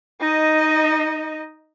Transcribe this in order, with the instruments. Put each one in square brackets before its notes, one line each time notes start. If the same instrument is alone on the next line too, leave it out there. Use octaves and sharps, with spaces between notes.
[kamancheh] D#4 D#5